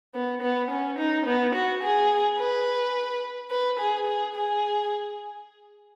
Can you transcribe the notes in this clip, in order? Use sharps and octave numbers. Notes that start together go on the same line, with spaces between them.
B3
B3
C#4
D#4
B3
F#4
G#4
B4
B4
G#4
G#4
G#4